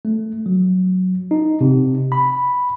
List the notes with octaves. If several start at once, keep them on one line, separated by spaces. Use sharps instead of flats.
A3
F#3
D#4
C3
B5